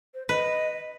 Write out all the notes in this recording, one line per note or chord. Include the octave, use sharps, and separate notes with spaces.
C5
B4 D#5